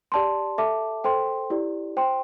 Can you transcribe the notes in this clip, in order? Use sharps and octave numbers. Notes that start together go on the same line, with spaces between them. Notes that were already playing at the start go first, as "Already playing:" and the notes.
G4 D5 A5 C6
A4 E5 A5 D6
A4 C5 G5 C6
E4 G4 D5
C5 G5 C6